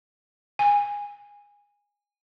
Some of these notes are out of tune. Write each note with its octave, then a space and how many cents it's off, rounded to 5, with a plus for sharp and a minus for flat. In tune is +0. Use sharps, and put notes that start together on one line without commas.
G#5 -20